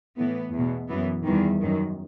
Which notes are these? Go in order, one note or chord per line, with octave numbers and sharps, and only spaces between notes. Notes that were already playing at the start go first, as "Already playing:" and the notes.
A2 E3 B3
E2
B2
F#2 E3 B3
E2 D#3 G3
F#2 D#3